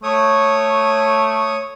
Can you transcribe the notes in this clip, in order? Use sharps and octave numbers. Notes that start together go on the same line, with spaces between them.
A3 C#5 D#6